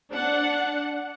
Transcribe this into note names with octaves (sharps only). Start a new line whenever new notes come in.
D4 F#5